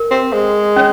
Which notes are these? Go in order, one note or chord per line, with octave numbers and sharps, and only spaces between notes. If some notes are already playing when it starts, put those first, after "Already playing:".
Already playing: A#4
C4
G#3
C#4 C#5